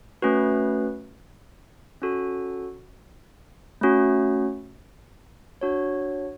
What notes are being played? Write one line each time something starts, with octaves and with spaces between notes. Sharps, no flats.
A3 C#4 F#4 B4
C#4 F#4 A4
A3 C#4 F#4
D4 F#4 C#5